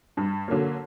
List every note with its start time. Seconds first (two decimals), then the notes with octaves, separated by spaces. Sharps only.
0.17 G2
0.48 D3 F#3 A#3